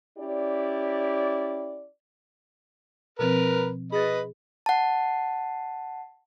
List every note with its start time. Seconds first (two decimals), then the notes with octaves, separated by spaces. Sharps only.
0.18 C#4 E4 G4 D5
3.19 B2 F3 C4 A#4 B4
3.92 G#4 B4 D#5 B5 A6
4.66 F#5 A5